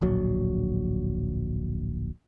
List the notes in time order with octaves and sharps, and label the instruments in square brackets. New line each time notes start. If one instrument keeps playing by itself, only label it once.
[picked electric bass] D1 A#1 F#3